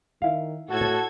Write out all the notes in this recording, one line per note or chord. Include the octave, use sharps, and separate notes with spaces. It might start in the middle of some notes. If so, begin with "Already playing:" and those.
D#3 E4 F5
A2 F#4 A4 G#6